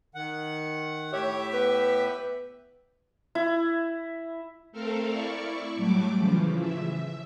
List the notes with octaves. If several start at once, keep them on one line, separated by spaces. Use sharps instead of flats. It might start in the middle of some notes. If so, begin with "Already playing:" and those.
D#3 F#5
A2 G4 C#5 E5
B3 B4
E4
A3 C4 A4 A#4 F5
E4 D5 C#6
A2 F#3 G3 A3 D6
C#3 E3 F3
E5